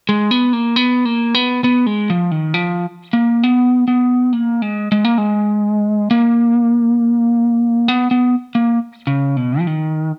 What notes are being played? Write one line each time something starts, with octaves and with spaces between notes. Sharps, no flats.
G#3
B3
A#3
B3
A#3
B3
B3
G#3
F3
D#3
F3
A#3
B3
B3
A#3
G#3
G#3
A#3
G#3
A#3
B3
B3
A#3
C#3
B2
F3
D#3